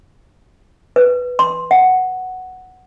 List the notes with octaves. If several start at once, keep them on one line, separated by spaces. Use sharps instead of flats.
B4
C6
F#5